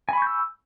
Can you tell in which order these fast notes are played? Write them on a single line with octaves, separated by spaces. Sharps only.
G#5 B5 C#6 G6 E6